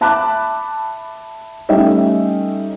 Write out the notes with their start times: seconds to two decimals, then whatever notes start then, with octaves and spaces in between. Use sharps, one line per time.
0.01 E5 A5 B5 D6 F#6
1.69 G3 A3 C#4 D#4 E5 G5